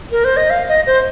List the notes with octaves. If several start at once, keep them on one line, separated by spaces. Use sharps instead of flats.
A#4
C5
D#5
F5
D#5
C5